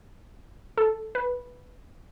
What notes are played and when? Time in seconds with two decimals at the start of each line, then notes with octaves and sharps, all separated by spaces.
0.77 A4
1.15 B4